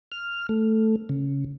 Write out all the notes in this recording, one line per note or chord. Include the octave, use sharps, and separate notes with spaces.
F6
A3
C#3